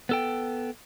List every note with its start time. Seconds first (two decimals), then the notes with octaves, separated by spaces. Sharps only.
0.09 B3 A4 G5